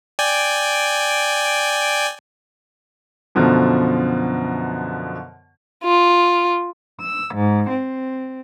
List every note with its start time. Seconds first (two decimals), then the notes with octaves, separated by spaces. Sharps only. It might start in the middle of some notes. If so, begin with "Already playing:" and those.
0.19 D5 G5 G#5
3.35 F#2 B2 D3 F3
5.84 F4
7.00 E6
7.33 G#2
7.68 C4